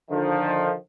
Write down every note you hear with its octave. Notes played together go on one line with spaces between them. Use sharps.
D3 D#3 F3